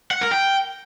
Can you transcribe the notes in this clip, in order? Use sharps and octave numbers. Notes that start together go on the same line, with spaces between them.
F#5
A#4
G5